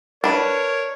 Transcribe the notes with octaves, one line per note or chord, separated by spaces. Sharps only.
D4 A#4 B4 C#5